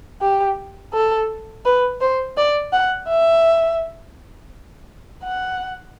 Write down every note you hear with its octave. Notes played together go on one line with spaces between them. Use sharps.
G4
A4
B4
C5
D5
F#5
E5
F#5